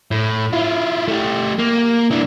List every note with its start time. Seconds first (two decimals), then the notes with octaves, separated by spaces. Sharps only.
0.11 A2
0.53 E4 F4
1.08 A3 G4
1.58 A#3
2.11 E3 D4